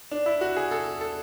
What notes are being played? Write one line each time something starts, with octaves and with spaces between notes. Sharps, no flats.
D4
E4
F#4
G#4
A4
A4